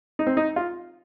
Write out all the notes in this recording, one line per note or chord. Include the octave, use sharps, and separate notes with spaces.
D#4
C4
D#4
F4